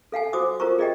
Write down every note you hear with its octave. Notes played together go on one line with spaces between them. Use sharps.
A4 F5 F#5 G#5
F#4 C5 D6 D#6
F4 A#4 C5 A#5 C#6
G#4 D5 D#5 G5